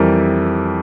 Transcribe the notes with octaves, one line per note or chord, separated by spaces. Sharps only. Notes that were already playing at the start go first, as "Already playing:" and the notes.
Already playing: F2 E3 G3 A#4